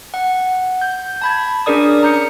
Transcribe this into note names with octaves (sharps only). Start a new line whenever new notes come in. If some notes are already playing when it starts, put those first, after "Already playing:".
F#5
G6
A5 B5 G#6
C#4 D4 G#4 A#4 D5 D#6
A#5 G6 C#7